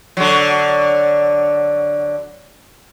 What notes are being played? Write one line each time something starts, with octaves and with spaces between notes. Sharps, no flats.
D3 F#3